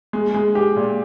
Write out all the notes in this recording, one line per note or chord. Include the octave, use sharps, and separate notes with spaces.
G#3
G#3
G4
A#2